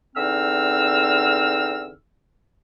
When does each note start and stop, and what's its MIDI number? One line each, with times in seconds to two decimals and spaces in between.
0.15 1.92 40
0.15 1.92 50
0.15 1.92 60
0.15 1.92 63
0.15 1.92 88
0.15 1.92 89